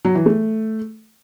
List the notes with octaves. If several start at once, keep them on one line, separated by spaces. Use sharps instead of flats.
F#3
E3
A3